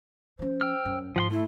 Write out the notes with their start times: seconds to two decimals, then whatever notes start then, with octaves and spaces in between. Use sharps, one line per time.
0.39 F3 C#4 C5
0.61 G5 E6 F6
0.85 F#2
1.16 G#2 F3 F#5 C6
1.31 A3 E4